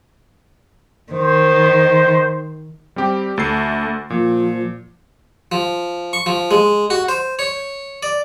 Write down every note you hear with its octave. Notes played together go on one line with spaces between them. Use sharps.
D#3 C5
G3 C4 G4
D2 A3 A4 C7
A#2 F3
F3
C#6
F3
G#3
F#4
C5
C#5
D5